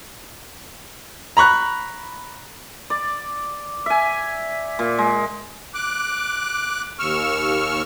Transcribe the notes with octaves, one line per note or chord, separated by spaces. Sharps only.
A#5 B5 C#6 F#6
D5
E5 G#5
A#2
G#3
D6 F#6
D#2 C#6 E6 F6